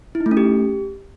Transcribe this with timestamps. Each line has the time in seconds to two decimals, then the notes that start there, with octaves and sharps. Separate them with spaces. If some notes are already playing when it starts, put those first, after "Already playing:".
0.15 E4
0.20 D#4
0.26 A3
0.31 C#4
0.37 G4